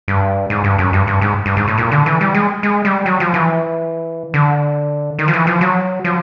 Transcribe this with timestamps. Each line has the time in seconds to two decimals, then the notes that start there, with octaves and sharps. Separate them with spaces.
0.08 G2
0.50 G#2
0.64 G2
0.78 F#2
0.93 G2
1.07 G2
1.21 G#2
1.46 G2
1.57 G#2
1.68 A2
1.78 A#2
1.91 D3
2.06 E3
2.21 G3
2.34 G#3
2.63 G#3
2.85 G3
3.06 F#3
3.20 F3
3.34 E3
4.34 D3
5.19 D#3
5.28 F3
5.33 E3
5.47 F3
5.61 F#3
6.04 F3